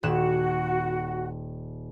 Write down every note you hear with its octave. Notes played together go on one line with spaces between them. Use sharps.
D#1 F#4 F#6 E7